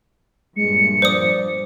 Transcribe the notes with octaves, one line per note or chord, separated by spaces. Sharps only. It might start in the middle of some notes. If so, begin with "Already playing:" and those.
G2 A#2 F3 G#3 C#7
C5 D5 D#6